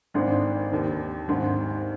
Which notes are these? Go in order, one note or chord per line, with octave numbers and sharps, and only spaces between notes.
G#1 G#2 D#3 D4
D#2 D#3
G#1 G#2 D#3